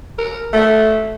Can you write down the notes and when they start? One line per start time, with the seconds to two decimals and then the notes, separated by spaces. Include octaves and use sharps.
0.19 A#4
0.53 A3